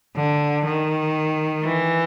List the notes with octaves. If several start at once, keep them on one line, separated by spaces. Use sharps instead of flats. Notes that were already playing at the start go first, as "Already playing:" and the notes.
D3
D#3
E3